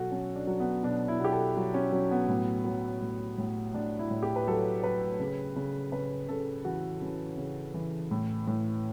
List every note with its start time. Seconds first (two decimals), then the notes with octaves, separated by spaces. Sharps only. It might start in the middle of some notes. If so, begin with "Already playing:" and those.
Already playing: B2 F#3 F#4 A4
0.11 F#3 C#4
0.36 D4
0.47 F#3
0.60 B3
0.83 B2 D4
1.08 E4
1.20 B2 G4
1.32 A4
1.57 F#3
1.74 C#4
1.92 F#3 C#4
2.11 B3
2.29 A2
2.65 F#3
3.02 A2
3.38 A2
3.74 A2 D4
3.99 E4
4.11 A2
4.23 G4
4.36 B4
4.47 F#3 A4
4.83 F#3 B4
5.20 C#3
5.56 C#3
5.92 C#3 B4
6.29 C#3 A4
6.65 E3 F#4
7.01 E3 C#4
7.37 C#3
7.74 E3
8.11 A2
8.48 A2